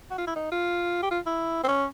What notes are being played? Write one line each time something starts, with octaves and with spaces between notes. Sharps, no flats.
F#4
F4
E4
D#4
F4
G4
F4
E4
C4
C#4